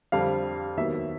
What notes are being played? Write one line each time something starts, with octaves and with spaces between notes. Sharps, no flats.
F2 D3 G3 C4 F5
D#2 D#3 F#3 B3 E5